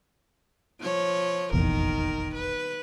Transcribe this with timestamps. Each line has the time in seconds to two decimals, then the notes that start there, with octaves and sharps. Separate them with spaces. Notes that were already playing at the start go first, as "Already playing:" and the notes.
0.80 F3 C#5
1.53 F1 A#1 E2 D#3 A#4
2.35 B4